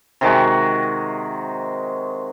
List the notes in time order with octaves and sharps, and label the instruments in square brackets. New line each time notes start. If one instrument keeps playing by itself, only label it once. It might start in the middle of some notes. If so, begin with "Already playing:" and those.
[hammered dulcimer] C3 D#3 G#3 F#4